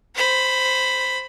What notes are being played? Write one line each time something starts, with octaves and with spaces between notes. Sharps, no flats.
C5 B5